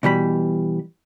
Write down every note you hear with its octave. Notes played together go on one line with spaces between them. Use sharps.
B2 E3 G3 B5